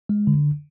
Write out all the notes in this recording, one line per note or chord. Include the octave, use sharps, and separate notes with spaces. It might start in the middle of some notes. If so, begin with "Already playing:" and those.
G#3
D3